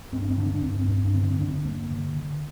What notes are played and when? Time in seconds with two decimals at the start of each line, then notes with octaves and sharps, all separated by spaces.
0.12 G2 C4
0.21 D4
0.29 C4
0.37 D3 D4
0.47 C4
0.54 D4
0.62 G2 C4
0.72 D4
0.80 C4
0.88 G2 D4
0.96 C4
1.05 D4
1.14 D3 C4
1.22 D4
1.31 C4
1.39 D3 D4
1.48 C4
1.65 G2 A#3
1.90 D3
2.15 D3